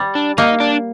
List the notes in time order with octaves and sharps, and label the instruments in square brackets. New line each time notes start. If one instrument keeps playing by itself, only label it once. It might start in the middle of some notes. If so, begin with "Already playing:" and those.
Already playing: [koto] G3
[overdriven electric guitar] D4
[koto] A#3 [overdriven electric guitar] D#4
[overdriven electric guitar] D4